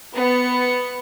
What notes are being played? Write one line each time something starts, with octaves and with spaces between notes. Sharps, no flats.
B3 C#7